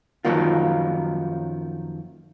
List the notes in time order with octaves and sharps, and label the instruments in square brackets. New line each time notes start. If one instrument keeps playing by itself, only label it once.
[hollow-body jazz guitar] F#2 D#3 F3 F#3 A#3 F4